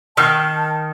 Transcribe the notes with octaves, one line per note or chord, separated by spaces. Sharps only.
D#3 A5 E6 F6 C7